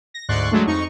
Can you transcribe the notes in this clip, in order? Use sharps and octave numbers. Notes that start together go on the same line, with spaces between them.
A#6
D2 G#2 D5 C6 C#6 F#6
F#3 G#3 A3 D4
F2 D#4 C#6 C#7